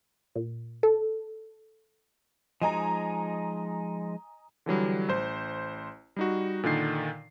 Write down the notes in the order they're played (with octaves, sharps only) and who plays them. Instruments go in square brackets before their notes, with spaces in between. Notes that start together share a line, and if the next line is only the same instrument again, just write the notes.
[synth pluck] A#2
A4
[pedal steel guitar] F3 G#3 D#4 [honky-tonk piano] D#5 G#5 A#5
[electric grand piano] D3 E3 F#3 G3
A1 C5
G3 D#4 F#4
A#2 D3 D#3 C7